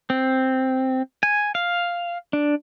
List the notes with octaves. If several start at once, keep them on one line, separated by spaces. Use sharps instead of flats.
C4
G#5
F5
D4